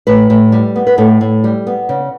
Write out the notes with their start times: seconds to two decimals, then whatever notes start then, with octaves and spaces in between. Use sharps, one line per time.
0.07 A2 B4
0.30 A2
0.52 G3
0.76 B3
0.87 B4
0.98 A2 A4
1.21 A2
1.44 G3
1.67 B3
1.89 C#3